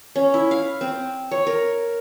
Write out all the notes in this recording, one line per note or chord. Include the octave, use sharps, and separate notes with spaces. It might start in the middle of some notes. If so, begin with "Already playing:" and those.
C#4
E4
F5
C4
C#5
A#4